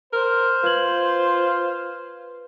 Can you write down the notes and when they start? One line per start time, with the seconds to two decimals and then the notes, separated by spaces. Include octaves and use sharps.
0.13 A#4 C5
0.64 F4 B4 G#6 F#7